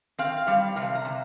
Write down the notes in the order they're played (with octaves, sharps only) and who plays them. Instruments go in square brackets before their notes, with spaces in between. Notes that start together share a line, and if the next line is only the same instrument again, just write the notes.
[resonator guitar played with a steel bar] C4 F5
G3 F5
C3 F5
A#5
C3